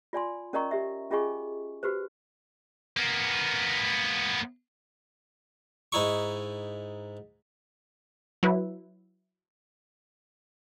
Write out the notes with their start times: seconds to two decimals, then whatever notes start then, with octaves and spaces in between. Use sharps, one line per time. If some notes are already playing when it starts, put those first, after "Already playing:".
0.13 F4 D5 G#5 C6
0.53 C#4 A#4 D5 D#5 A#5 C#6
0.71 G4 E5
1.11 C#4 F4 G#4 D#5 G#5 C#6
1.83 F#4 G4 B4 C5
2.97 A#3 B3
5.92 G#2 D#4 E4 C#6
8.43 F#3 E4 B4